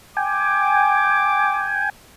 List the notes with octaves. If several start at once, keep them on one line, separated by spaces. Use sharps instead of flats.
G5 G#5 D6